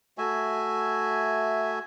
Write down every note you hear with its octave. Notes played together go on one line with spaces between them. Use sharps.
A3 F#4 E5 G#5